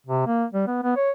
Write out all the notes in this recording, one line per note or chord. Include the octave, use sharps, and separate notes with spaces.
C3
A#3
G3
B3
B3
C#5